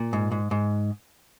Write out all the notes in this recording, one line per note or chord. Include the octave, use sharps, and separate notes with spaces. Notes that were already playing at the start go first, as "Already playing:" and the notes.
Already playing: A#2
G#2
G#2
G#2